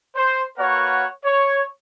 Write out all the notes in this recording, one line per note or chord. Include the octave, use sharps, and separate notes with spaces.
C5
A#3 F#4 A#4 B4 C#5 F#5
C#5